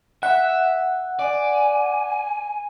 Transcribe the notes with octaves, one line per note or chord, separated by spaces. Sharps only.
E5 F#5
D5 G#5